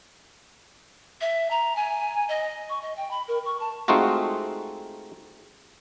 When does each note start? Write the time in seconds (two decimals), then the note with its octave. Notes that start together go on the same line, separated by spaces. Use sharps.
1.21 E5
1.51 A#5
1.76 G#5
2.29 D#5
2.70 C#6
2.82 D#5
2.97 G5
3.11 B5
3.28 A#4
3.46 C#6
3.60 A5
3.88 G#3 A3 C4 D#4 F4 F#4